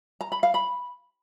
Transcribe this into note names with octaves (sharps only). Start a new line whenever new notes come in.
A#5
B5
F5
B5